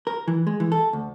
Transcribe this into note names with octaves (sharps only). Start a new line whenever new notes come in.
A#4
E3
G#3
E3
A4
D2